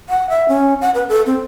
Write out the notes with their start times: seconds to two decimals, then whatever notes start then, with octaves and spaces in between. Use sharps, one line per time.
0.09 F#5
0.30 E5
0.48 C#4
0.81 F#5
0.95 B4
1.09 A4
1.26 C4